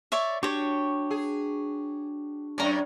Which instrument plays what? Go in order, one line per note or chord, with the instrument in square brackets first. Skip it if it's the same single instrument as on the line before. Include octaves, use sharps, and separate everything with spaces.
[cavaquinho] C#5 D5 E5
[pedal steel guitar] D4 F#4 C#6 [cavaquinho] G4 C#5
[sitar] G#4
[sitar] F#2 C#4 [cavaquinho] D5 A#5